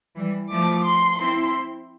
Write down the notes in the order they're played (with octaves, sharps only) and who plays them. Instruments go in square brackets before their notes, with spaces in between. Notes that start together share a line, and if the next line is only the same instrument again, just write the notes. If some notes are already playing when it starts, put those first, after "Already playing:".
[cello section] E3 G3
[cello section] F3 A3 [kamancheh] D6
[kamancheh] C6
[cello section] C4 E4 [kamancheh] C6